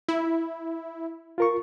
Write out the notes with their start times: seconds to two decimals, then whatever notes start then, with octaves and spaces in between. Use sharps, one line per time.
0.09 E4
1.38 F4 A#4 C#6